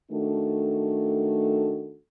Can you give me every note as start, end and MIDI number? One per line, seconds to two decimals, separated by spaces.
0.12 1.97 51
0.12 1.97 57
0.12 1.97 62
0.12 1.97 66
0.12 1.97 69